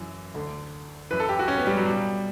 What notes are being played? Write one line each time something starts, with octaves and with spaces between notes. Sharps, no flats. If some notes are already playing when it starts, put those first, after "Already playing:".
Already playing: F#2 E3
D2 D3
F#2 E3 B4
A4
G4
F#4
C#4
B3
G3
F#3
C#2 B2 G3